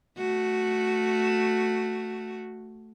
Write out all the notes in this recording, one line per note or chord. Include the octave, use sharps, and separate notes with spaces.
A3 F#4